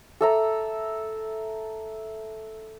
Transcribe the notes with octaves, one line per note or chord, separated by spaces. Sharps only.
A4 E5 A#5